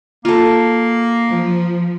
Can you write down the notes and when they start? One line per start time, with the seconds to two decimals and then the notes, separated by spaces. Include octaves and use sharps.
0.25 A#3 F4 A4
1.29 F3